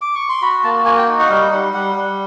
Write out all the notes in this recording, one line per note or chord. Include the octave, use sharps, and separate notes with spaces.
D6
C#6
C6
F#4 B5
A#3 A5
F#4 G#5
G5
D#4
F#5
G3 F5
G3 F#5
G3 F#5
G3